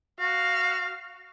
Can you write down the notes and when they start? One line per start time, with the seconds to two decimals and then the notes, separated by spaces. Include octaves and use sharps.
0.20 F#4 F5